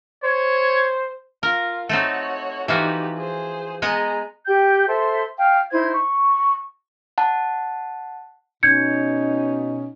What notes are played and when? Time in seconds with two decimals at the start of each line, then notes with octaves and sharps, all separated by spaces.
0.24 C5 C#5
1.43 F4 A#4
1.89 A3 C4 D#4 F#4 C#5
2.68 E3 F3 D#4 F#4 G4
3.16 G#4 C5
3.82 G#3 B3 G#4 D#5 A#5
4.46 G4 G5 G6
4.87 A4 C5 E5 C6
5.38 F5 G5
5.71 D#4 E4 C5 G#6
5.93 C#6
7.18 F#5 A5
8.63 B2 C#4 D#4 G6 G#6 C#7